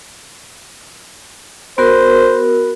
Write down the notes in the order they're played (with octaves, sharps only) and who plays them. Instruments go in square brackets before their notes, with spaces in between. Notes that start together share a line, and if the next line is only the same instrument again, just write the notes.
[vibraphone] B3 F#4 A#4 [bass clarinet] C5